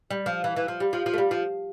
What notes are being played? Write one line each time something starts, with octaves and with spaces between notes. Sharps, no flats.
G3
F3
E3
E3
F3
G3
F3
F3
A3
G3
F3